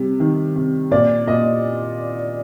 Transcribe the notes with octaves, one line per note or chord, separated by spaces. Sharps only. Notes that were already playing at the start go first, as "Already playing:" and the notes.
Already playing: C3 G3
D#3
C3
A#2 D5
A#2 D#5